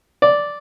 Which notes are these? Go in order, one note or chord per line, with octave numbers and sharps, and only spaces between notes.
D5